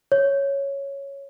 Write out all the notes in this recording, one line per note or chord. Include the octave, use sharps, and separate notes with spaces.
C#5